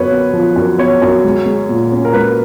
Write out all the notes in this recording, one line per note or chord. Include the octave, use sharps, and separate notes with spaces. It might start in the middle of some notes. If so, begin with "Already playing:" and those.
Already playing: F#2 B3 B4 C#5
B3
F3
F#2
B3 C#5
F#2
G#3
G#3
A#2
C#4
A#4
G#3 B4